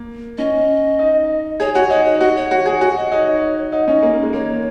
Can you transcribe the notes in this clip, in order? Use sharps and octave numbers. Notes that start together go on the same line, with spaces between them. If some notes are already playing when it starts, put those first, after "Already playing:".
Already playing: A#3
C#4 D#5
D#4
G#4 C#5
F#4 C#5
D#4 C#5
C#5
F#4 D#5
C#5
F#4
G#4
F#4 F#5
D#5
D#4 C#5
D#4 F#5
C#4 D#5
A#3
A#3
G#3
A#3 C#5